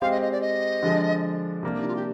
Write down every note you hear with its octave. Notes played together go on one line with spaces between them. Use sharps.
G#3 C4 G4 C5 F5
D#5
D#5
D5
D#5
D3 F3 G#3
C3 G3 A#3 D4
D#4
F4
G4